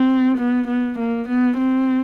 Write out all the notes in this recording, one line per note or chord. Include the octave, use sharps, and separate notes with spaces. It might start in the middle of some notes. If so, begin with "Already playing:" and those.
Already playing: C4
B3
B3
A#3
B3
C4